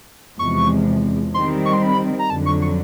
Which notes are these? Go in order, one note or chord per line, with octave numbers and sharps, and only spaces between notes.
E2 C3 F3 G#3 C#6
D#3 G3 C4 C6
C#6
C6
B5
A#5
F2 D3 F#3 A5
C#6
C#6